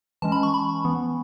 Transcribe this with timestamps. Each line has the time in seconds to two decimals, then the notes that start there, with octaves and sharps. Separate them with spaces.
0.22 E3 G#3 C#4 A5
0.32 B5
0.43 C#6
0.54 B5
0.85 E3 B3